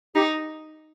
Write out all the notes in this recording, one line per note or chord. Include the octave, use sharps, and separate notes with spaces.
D#4 G4